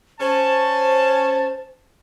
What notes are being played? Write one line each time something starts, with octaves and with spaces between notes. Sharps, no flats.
C#4 C5 A5